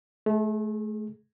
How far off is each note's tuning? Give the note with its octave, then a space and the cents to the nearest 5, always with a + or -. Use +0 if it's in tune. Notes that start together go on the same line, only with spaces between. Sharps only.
A3 -30 G#4 +10